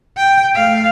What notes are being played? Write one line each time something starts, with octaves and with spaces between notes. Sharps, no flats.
G5
A3 F5